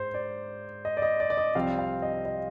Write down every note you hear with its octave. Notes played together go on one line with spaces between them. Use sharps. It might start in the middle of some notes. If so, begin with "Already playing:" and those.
Already playing: G#2 C5
D5
D#5
D5
D#5
D5
D5
D#5
C2 C3 F3 C4 F5
F5
D#5
D#5